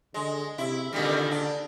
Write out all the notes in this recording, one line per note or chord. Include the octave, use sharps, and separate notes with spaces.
D3 G#3
C3 E4
A#2 D3 D#3 G3
D4